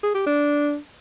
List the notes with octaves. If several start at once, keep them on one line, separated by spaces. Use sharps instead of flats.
G#4
G4
D4